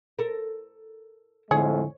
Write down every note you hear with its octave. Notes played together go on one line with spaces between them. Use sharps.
A4 A#4
F2 A2 D3 G#3 G#4 C#5